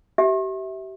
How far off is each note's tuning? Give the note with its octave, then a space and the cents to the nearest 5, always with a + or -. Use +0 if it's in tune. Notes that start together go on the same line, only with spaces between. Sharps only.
G4 -35 E5 -15